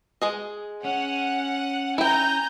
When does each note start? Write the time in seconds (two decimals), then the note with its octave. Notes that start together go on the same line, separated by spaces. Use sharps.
0.22 G#3 G#4 D#5
0.85 C#4 F#5
1.98 E4 G5 G#5 A#5 G6